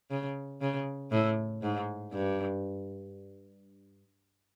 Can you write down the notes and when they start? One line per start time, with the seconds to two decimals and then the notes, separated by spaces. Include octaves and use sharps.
0.10 C#3
0.61 C#3
1.11 A2
1.62 G#2
2.12 G2